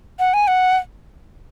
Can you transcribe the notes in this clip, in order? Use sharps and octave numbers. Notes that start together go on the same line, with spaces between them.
F#5
G#5
F#5